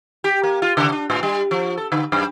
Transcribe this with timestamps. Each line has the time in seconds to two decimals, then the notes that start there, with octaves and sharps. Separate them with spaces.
0.24 G4
0.43 A#3
0.62 F4
0.77 C#3
0.92 D4
1.10 A2
1.23 G3
1.51 F3
1.77 A4
1.92 D3
2.12 F#2